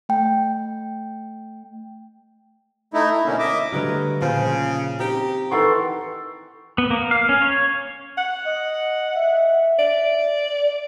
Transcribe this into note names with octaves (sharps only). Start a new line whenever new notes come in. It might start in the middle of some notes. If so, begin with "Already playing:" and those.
A3 G5
A3 D#4 E4
E4
B2 D3 A#3 C#4
D#5 E5 D6
D3 F#3 G3 A3 A#4 B4 C#5
D#5
A#2 C#3 F3 F4 G#4 C5
C4 D#4 G4
D#3 E3 B3 A4 C6 C#6
B3
A#3
F5
C#4
C#5
F#5
D#5
E5
D5